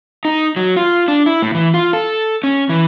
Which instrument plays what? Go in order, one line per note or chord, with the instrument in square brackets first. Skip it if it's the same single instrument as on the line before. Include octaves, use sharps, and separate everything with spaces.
[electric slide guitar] D#4
F#3
F4
D4
E4
A2
E3
F4
A4
C#4
E3